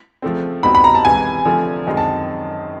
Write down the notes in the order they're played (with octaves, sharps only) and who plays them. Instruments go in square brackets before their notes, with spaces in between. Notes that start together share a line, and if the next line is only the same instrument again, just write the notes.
[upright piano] C#3 F3 A3 C4
[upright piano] B2 G3 C4 D#4 F#4 [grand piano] B5
[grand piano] B5
A#5
A5
[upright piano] C#2 C3 E3 [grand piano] G#5
[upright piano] D3 F3 A3 C4
F#2 D#3 G#3 C4 D#4
[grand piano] A5